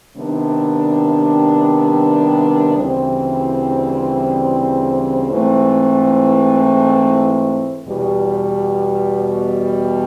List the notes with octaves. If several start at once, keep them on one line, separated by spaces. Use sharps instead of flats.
C3 D#3 G3 B3 D4
D2 C#3 E3 G3 C4
G#2 E3 A3 C4
E2 B2 G3